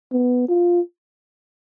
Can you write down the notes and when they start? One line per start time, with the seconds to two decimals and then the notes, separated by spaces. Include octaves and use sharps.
0.12 B3
0.49 F4